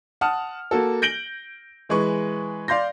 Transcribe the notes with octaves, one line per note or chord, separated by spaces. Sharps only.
F#5 A5 D#6 F6
A#3 F#4 A4
G6 A#6 D7 F#7 G7
E3 G#3 B4 C#6
D5 F5 C6 G6 A#6